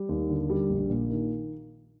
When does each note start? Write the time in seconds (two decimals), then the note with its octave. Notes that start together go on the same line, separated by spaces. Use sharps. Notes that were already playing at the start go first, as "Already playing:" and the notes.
Already playing: G3
0.09 D#2
0.30 D3
0.50 G3
0.70 A#1
0.90 A#2
1.10 D#3